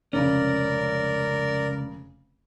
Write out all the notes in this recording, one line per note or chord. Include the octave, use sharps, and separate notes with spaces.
F1 C#2 C#3 C#4 A#4 D5